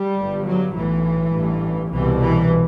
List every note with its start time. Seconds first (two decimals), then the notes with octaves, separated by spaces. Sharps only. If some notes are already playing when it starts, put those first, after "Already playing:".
Already playing: G3
0.16 G1 G2
0.45 F#3
0.74 B1 A2 E3
1.32 A1 G2
1.90 C2 B2 E3
2.20 E3